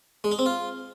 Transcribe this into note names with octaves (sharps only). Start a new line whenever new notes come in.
G#3
D#4
C4
F4